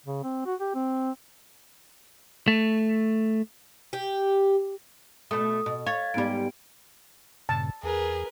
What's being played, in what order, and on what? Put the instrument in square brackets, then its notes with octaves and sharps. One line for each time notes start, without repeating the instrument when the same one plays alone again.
[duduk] C#3
C4
F#4
G4
C4
[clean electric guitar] A3
[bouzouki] G4
[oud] B2 A3 [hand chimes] D#6
[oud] B2
[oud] C#5 [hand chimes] F5 G#6 A6
[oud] G#2 G3 [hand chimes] B3 D7
[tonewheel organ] G2 A#2 C#3 [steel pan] A5
[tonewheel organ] E2 [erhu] G#4 [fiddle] A#4 B4